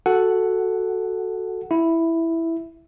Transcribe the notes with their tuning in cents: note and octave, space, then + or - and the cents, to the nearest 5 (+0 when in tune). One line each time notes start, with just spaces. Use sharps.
F#4 +0 A4 +0 F#5 +0
E4 +0 E5 +0